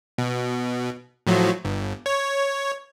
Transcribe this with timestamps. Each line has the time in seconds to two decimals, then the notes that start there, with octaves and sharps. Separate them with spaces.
0.18 B2
1.27 A2 F3 F#3
1.65 G1
2.06 C#5